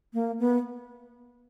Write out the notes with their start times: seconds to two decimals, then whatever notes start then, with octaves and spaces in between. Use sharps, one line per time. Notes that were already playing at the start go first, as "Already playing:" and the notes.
0.14 A#3
0.39 B3